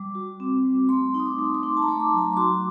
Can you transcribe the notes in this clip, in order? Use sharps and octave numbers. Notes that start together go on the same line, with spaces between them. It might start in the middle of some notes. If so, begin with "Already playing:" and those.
Already playing: G3 D6
F#4
C4
G3
A3 C6
D#4 D#6
D6
A3
D6
D#4 C6
A5
A#5
A3
D6
F#3
A#5
D6
F#4 C6